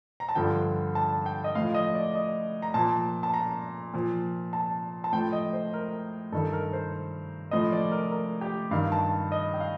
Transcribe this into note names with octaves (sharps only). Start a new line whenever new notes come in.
A#5
A5
G2 D3 F3 G5
A5
G5
D#5
A2 F3 F5
D#5
D5
D#5
A#5
A#2 F3 A5
A5
A#5
A#2 F3
A5
A5
A2 F3 G5
D#5
C5
A#4
G2 D#3 A4
A#4
C5
A2 F3 D#5
D5
A#4
A#4
G4
G2 D#3 F5
A5
D#5
G5
F5